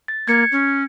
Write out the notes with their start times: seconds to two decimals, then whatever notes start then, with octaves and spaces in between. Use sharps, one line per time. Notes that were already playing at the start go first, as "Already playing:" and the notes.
0.08 A6
0.28 A#3 G#6 C#7
0.52 C#4